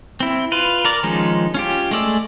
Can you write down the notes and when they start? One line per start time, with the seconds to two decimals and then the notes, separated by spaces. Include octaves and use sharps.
0.20 C4 E4
0.52 F4 B4
0.85 A#4 D5
1.03 D#3 F3 G#3 C#4 D#4
1.54 C#4 F4 G4
1.91 G#3 A3 D5 E6